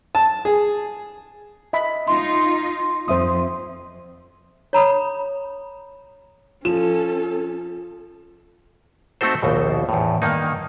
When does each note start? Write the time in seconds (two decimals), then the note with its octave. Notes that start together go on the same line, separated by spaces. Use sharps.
0.15 A5
0.45 G#4
1.73 D#5 E5 B5
2.08 D#4 F4 C6
3.08 F2 C5 E5 D#6
4.73 C#5 A#5 B5 D#6
6.65 F3 C#4 A4 E7
9.21 A3 C4 D#4 F#4 A4 C5
9.42 A#1 D#2 B2
9.89 E2 A2
10.22 G2 D#3 A#3 D#4